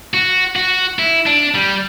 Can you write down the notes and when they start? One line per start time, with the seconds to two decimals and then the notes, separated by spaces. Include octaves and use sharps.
0.14 F#4
0.56 F#4
0.99 E4
1.26 D4
1.55 G3